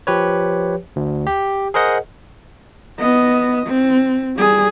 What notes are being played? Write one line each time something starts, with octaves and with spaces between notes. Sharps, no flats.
F3 G4 B4 C#5
D2
G4
G#4 A#4 C5 D#5 F#5
B3 D#5
C4
G3 G#4